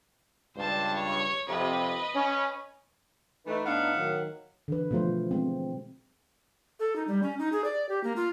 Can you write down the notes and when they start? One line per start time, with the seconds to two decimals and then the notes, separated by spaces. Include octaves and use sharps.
0.56 C#2 G2 C5 A5
0.95 C#5
1.49 F2 C3 B4 D#5
2.15 C#4
3.47 E3 A3 D#4 B4
3.66 A2 B3 D4 D#4 F5 F#5
3.95 D#3 F#3
4.68 D3 E3 B4
4.91 B2 F3 A3 F4 C5
5.31 G#3 C4
6.80 A4
6.96 D#4
7.08 G3
7.23 C#4
7.39 D#4
7.52 G#4
7.64 D5
7.89 G4
8.04 A#3
8.16 F4